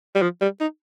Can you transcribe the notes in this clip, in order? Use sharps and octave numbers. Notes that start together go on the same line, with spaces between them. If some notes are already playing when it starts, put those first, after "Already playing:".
G3
F3
G3
D#4